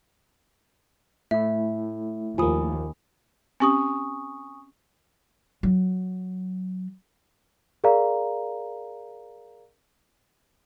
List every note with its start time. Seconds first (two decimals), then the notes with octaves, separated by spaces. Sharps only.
1.31 A2 A3 E4 E5
2.38 D#2 F3 A#3 G#5 B5 D#6
3.60 C4 C#4 G4 G#5 C#6 D#6
5.63 F#3
7.84 G#4 A#4 D5 F5 A#5